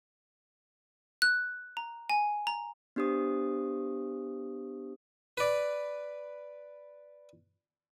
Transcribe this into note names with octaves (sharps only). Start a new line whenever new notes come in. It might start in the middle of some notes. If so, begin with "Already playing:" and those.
F#6
A#5
G#5
A#5
B3 D4 G4 C5 D#6
B4 D5